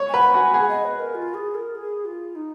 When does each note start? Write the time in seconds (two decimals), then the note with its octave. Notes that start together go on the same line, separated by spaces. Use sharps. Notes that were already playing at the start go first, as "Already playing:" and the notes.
Already playing: C#5
0.08 G#5
0.14 B4 F#5
0.34 F#4 G#5
0.54 G#4 F#5
0.69 D#5
0.84 B4
0.99 A#4
1.15 F4
1.34 G#4
1.55 A#4
1.75 G#4
2.05 F4
2.35 D#4